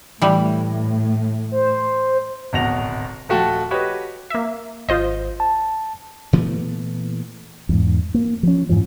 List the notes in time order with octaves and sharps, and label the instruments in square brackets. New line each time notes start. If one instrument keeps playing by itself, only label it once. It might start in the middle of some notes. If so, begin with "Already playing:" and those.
[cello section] A2 [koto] E3 G3
[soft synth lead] C5
[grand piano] D1 G#1 B2 F#5 A#6 F7
D#1 F3 A3 F#4 G5 A5
F#4 G4 B4 C#5 D#5
[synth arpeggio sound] A#3 E5
[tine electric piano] G#1 [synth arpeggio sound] F4 C5 D#5
[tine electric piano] A5
[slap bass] A#2 E3 A3 B3
[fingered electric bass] E2 G#2
A#3
F3 C#4
F2 G#2 E3 F3